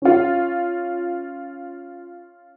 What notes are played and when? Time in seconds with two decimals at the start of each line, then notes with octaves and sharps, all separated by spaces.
0.02 C#4 F4